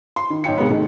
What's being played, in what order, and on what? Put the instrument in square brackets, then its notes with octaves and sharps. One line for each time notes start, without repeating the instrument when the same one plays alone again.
[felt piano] C6
D#3
B1 C#5 G5 C#7
C3 G#3 A#3 B3
B2 D#3 A3